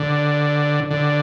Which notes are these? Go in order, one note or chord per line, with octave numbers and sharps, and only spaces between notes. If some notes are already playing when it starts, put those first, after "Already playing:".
Already playing: D3
D3